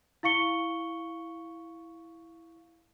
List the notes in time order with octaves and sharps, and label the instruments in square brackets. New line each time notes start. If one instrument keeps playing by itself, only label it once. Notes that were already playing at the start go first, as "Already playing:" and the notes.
[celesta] E4 F5 C#6 C#7 G7